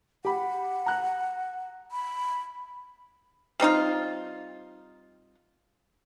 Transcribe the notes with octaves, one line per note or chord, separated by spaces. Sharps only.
G4 F#5 B5
A#5 F#6
B5
G3 C4 D#4 F4